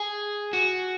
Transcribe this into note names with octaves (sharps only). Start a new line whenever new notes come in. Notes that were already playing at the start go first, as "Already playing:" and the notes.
Already playing: G#4
F#4